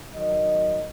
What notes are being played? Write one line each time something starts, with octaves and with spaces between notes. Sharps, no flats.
D#3 F#3 D#5